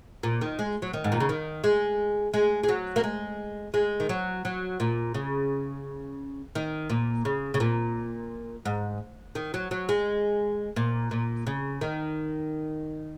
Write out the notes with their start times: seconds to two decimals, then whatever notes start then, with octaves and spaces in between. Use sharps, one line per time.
0.23 A#2
0.41 D#3
0.59 G#3
0.82 F#3
0.93 D#3
1.04 G#2
1.12 A#2
1.20 C#3
1.29 D#3
1.64 G#3
2.34 G#3
2.63 G#3
2.69 F#3
2.96 A#3
3.04 G#3
3.74 G#3
4.00 D#3
4.09 F#3
4.45 F#3
4.80 A#2
5.14 C#3
6.55 D#3
6.90 A#2
7.25 C#3
7.54 C#3
7.60 A#2
8.65 G#2
9.35 D#3
9.54 F#3
9.71 F#3
9.89 G#3
10.76 A#2
11.11 A#2
11.47 C#3
11.81 D#3